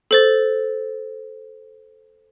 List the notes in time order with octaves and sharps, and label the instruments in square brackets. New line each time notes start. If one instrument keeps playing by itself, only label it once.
[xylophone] A4 C5 A6